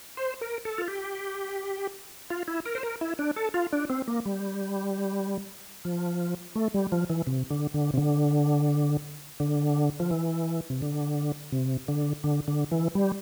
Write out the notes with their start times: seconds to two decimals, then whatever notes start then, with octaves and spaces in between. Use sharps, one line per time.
0.17 C5
0.41 A#4
0.65 A4
0.78 F4
0.88 G4
2.30 F4
2.48 E4
2.66 A#4
2.75 C5
2.83 A#4
3.01 E4
3.19 D4
3.36 A4
3.54 F4
3.73 D4
3.90 C4
4.08 A#3
4.26 G3
5.85 F3
6.56 A3
6.74 G3
6.92 F3
7.10 E3
7.27 C3
7.50 D3
7.74 D3
7.94 C3
7.97 D3
9.40 D3
10.00 F3
10.11 E3
10.70 C3
10.82 D3
11.52 C3
11.88 D3
12.24 D3
12.48 D3
12.71 E3
12.95 G3